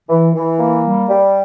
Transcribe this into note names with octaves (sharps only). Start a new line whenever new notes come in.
E3
E3
A#3
G3
G3